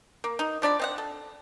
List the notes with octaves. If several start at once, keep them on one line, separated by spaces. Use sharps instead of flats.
A#3
D#4
F3 D4 D5 B5
C4 D#5 F#5
A4